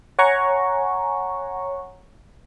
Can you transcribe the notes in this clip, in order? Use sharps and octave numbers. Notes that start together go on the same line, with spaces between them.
C#5 F#5 G#5 A#5 C#6